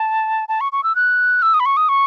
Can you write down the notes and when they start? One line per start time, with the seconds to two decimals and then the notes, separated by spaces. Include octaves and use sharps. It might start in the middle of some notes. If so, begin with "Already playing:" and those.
Already playing: A5
0.49 A5
0.61 C#6
0.72 C#6
0.84 E6
0.95 F#6
1.42 E6
1.54 D#6
1.60 B5
1.66 C#6
1.77 D#6
1.89 C#6